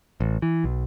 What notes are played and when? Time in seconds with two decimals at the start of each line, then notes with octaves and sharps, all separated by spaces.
0.20 A1
0.42 E3
0.64 B1